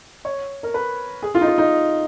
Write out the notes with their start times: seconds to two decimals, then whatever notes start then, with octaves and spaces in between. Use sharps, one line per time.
0.25 C#5
0.63 A#4
0.74 B4
1.22 G#4
1.35 F4
1.41 D#4
1.47 F4
1.58 D#4